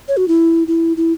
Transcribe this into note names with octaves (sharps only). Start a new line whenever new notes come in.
C#5
F#4
E4
E4
E4